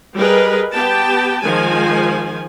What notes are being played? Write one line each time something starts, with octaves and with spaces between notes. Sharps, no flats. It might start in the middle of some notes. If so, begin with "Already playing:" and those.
G3 G#4 A#4 B4 D#5
B3 G4 G5 A5
D#3 F3 G#3 G#5